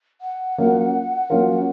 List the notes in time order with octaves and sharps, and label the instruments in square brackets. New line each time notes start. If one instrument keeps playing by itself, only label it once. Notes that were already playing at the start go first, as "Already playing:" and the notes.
[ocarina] F#5
[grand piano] F#3 A#3 C#4 F4 A#4
F#3 A#3 C#4 F4 A#4